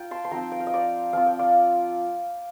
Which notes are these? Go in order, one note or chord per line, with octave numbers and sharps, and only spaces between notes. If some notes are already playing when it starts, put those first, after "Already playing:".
Already playing: D#4 F4 F5 G5
A5 C6
C6
F3 C4 D#4 G5 A#5
G5
F5
D#5
D5 F5
F3 C4 F4 F5
G5
D5 F5